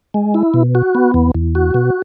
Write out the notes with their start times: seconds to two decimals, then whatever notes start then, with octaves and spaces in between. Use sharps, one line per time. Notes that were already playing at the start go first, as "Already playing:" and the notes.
0.14 G#3
0.34 E4
0.54 B2
0.75 F#4
0.95 B3
1.14 E2
1.35 E2
1.55 F#4
1.74 B2